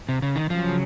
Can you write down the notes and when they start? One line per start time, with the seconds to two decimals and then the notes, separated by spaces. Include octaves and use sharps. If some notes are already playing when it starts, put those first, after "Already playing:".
0.09 C3
0.22 C#3
0.36 D#3
0.50 C#3 F3 F#3 C#4